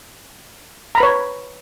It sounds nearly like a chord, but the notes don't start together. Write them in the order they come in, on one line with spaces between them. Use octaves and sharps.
A#5 B5 B4 C#5